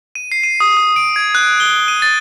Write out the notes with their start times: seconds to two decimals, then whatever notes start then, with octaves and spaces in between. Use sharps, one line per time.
0.15 D#7
0.32 C7
0.43 D#7
0.60 D#6
0.77 D#6
0.96 D7
1.16 G#6
1.35 F#6
1.60 G7
1.88 D#7
2.02 A6